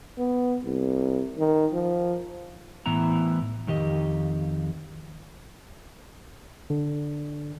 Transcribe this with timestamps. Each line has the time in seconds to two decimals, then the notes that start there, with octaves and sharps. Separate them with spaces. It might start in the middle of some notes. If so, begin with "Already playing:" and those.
0.18 B3
0.64 C2
1.38 D#3
1.73 F3
2.86 A2 E3 B3 E4 A#5
3.67 F2 D#3 G4 D#5
6.70 D3